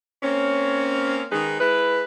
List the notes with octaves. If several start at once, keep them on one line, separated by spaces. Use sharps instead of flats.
A#3 C4 C#4
D#3 G#3 D#4 G#4 B4
G#3 E4 B4